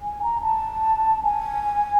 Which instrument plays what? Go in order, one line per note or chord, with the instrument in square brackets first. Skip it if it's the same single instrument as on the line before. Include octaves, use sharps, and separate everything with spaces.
[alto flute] G#5
A#5
A5
G#5